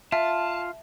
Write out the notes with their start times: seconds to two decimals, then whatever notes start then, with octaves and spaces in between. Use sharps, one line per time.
0.12 F4 E5 A5